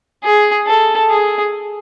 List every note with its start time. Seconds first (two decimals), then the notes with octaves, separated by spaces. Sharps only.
0.24 G#4
0.67 A4
1.10 G#4